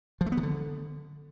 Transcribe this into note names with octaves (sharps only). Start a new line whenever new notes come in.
F3
A3
B3
D#3
D3